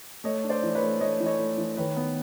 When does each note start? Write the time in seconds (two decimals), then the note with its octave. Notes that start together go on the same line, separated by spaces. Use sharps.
0.24 A3 C#5 D#5
0.44 D4
0.50 C5 D5
0.63 E3
0.75 B4 C#5
0.82 A3
1.01 A3 C#5 D#5
1.20 E3
1.26 C#5 D#5
1.39 A3
1.58 E3
1.77 D#3 B4 C#5
1.97 B3